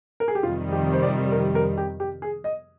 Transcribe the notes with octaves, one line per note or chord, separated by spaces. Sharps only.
A#4
G#4
G4
F2 C3 D#3 G3 F4
G4
C5
D5
A#4
A#4
G4
G4
G#4
D#5